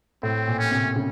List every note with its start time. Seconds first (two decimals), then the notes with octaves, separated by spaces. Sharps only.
0.23 A2 C4
0.48 A#2
0.59 C#4
0.71 C3
0.96 C#3